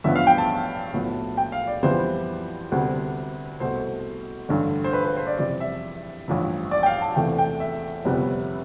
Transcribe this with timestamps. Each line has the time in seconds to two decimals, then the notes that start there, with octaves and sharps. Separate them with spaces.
0.04 A1 G2 F3 B3 E5
0.16 F5
0.27 G5
0.38 A5
0.93 B1 A2 F3 B3
1.37 G5
1.52 F5
1.67 D5
1.83 F2 E3 G3 B3 C5
2.72 D2 C3 G3 B3
3.60 C2 B2 A3 C5
4.49 A1 G2 D3
4.84 C5
4.93 B4
5.05 B4
5.17 C5
5.27 D5
5.38 F2 C3 E3 G3 D5
5.60 E5
6.28 A1 G2 F3
6.71 D5
6.83 G5
6.86 F5
7.02 A5
7.16 E2 C3 E3 A3 G5
7.38 G5
7.60 E5
8.05 G1 F2 C3 G3 B3